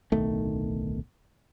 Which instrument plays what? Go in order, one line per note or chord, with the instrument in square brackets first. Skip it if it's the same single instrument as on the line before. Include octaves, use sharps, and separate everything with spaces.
[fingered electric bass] D1 B1 D#3 A3